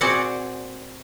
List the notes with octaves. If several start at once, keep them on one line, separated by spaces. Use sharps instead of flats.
A#2 C4 F#4 G#4 D5 F#5